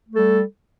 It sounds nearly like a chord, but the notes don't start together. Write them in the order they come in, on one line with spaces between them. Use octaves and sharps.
A3 A4 G3